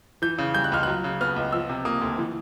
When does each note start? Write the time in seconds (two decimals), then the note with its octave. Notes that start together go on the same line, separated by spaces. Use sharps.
0.22 E3 G6
0.38 C#3
0.54 G3 G6
0.64 F#6
0.72 C#2 F6
0.83 F#3 F#6
1.04 C#3
1.21 B3 F6
1.36 C#2
1.52 F3 E6
1.69 C3
1.85 A#3 D#6
2.02 D2
2.18 E3